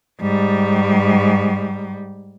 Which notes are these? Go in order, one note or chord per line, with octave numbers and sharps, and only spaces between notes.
G#2 G3